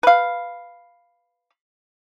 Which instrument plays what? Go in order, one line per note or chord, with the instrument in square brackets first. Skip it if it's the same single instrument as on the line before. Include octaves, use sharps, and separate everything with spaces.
[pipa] B4 F5